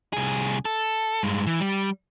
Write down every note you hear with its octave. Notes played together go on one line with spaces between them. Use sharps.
C2 G#4
A4
G2 G#3
E3
G3